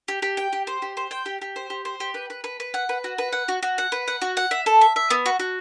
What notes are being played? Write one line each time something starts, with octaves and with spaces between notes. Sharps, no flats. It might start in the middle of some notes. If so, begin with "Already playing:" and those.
G4
G4
G5
G4
C5
G4
C5
G5
G4
G4
C5
G4
C5
G4
B4
B4
B4
B4
F#5
B4
F#4
B4
F#5
F#4
F#4
F#5
B4
F#5
F#4
F#5
E5
A4
E5
E5
B3
F#4
F#4